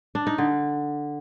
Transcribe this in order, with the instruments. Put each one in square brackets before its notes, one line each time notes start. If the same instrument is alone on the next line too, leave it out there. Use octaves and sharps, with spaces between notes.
[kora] D4
D#4
D3